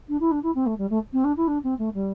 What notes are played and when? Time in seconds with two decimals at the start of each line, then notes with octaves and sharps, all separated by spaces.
0.09 D4
0.20 E4
0.31 D4
0.43 E4
0.55 C4
0.66 A3
0.78 G3
0.90 A3
1.13 C4
1.24 D4
1.37 E4
1.47 D4
1.63 C4
1.78 A3
1.94 G3